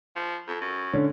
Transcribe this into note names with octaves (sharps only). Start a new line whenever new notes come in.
F3
F2
F#2
D3 C#4